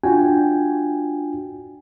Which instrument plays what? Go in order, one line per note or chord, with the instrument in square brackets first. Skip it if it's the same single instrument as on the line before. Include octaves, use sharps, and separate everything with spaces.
[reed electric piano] D4 F4 F#4 G5 G#5